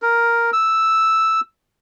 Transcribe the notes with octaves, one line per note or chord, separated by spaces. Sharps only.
A#4
E6